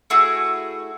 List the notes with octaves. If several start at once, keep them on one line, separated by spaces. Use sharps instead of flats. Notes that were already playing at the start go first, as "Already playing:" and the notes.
A3 E4 F#4 G#4